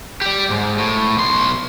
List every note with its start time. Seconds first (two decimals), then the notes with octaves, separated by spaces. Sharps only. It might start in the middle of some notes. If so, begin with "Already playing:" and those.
0.21 G4 D5
0.50 G#2
0.78 A2
1.17 B1 C6